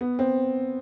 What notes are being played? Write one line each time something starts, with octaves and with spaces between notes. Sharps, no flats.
B3
C4